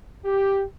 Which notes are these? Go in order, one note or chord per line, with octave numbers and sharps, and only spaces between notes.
G4